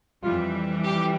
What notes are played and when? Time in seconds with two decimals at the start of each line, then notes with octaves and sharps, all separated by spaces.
0.22 F2 E3 G3 F4
0.84 G4